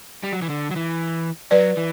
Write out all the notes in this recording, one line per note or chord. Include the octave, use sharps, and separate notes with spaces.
G3
F#3
E3
D3
F#3
E3
F#3 B4 D5
E3